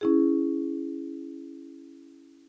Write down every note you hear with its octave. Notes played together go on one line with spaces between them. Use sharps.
C#4 E4 G#4